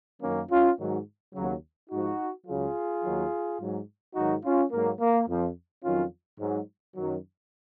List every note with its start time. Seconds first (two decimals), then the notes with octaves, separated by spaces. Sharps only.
0.22 F#2 D#3 F#3 A#3 C#4
0.50 C#4 F4
0.79 G#2 D#3 F#3
1.35 D#2 C#3 F#3
1.90 G#2 F3 D#4 F#4
2.47 C#2 C#3 F#3 F4 G#4
3.04 D#2 D#3 F#3
3.59 G#2 F#3
4.15 G#2 D#3 F#3 D#4 F#4
4.43 C#4 F4
4.72 G#2 F#3 A#3
5.00 A#3
5.28 F2 F3
5.84 F2 D#3 F#3 C#4 F4
6.39 G#2 F#3
6.95 F#2 D#3 F#3